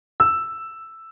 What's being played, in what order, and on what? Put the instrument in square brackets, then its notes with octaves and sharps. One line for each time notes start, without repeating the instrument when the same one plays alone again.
[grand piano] E6